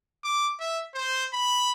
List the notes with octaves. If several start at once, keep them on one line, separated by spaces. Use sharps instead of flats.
D6
E5
C5
B5